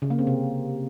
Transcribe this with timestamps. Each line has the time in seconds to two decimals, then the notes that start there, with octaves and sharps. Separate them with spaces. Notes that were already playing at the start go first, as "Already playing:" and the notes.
0.02 C#3
0.10 A#3
0.19 C4
0.27 C3